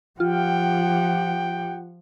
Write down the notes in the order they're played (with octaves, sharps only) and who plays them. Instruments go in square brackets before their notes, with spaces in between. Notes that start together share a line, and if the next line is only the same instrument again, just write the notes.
[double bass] F3 [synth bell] F4 [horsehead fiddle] G4 F#5 [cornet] G5